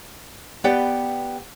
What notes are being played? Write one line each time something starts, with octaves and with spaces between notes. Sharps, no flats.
B3 G4 B4 D5 F#5 G5